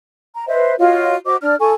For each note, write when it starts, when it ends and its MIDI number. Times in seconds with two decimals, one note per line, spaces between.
0.35 0.47 82
0.48 0.74 71
0.48 0.74 72
0.48 0.74 75
0.48 0.74 76
0.78 1.15 65
0.78 1.15 66
0.78 1.15 73
0.78 1.15 75
1.25 1.35 66
1.25 1.35 72
1.25 1.35 75
1.25 1.35 86
1.41 1.55 62
1.41 1.55 74
1.41 1.55 89
1.60 1.73 64
1.60 1.73 69
1.60 1.73 80
1.60 1.73 85